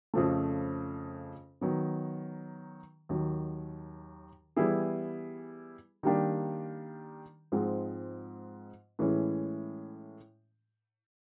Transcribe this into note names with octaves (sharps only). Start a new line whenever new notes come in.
F2 C#3 F3 A3
D#3 F#3 B3
D#2 D#3 F#3
E3 G3 B3 E4 G#4
D#3 G3 A#3 D4 G4
G#2 F3 G#3 C4
A2 E3 G#3 C#4